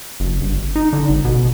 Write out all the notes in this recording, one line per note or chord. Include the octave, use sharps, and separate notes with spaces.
F#1
G1
D#4
D3
G#1
B2